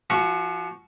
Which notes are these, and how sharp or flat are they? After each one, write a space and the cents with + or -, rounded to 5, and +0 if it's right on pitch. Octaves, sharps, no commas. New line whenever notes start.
F3 -30 F#4 +0